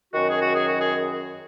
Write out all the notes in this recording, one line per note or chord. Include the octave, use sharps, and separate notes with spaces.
F#2 D#3 F#4
G#4
F#4
G#4
F#4
G#4